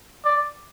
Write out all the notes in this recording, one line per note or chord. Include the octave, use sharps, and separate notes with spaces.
D5